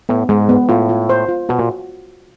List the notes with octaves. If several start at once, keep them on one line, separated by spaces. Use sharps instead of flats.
A2 B3
G#2 G#3
B3
A2 F4
F4
C5
F4
B2 F#4
A#2